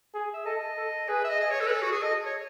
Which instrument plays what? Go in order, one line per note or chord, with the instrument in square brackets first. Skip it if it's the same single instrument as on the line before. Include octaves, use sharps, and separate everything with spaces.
[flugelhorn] G#4
[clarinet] E5
[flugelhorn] A4 [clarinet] D#5
[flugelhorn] A4
[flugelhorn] G#4 [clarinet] B4
[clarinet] E5
D#5
[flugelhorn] G#4 [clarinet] D#5
[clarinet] C#5
A4
B4
[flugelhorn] G#4 [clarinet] A4
[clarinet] F#4
G#4
[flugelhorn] A4 [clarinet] D#5
[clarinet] C#5